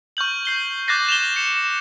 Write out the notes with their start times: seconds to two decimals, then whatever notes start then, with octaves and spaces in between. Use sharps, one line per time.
0.17 C#6 F6 G6 F#7
0.45 G6 C7 G7
0.88 D6 F#6 G6 A6 A#6 C7
1.09 E7 F7 G7
1.36 C#7